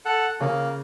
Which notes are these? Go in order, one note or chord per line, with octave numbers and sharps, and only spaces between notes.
A4 F#5
C#3 A#3